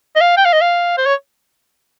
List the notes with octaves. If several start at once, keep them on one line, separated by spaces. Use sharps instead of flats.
D#5
F5
G5
F5
D#5
F5
C5
C#5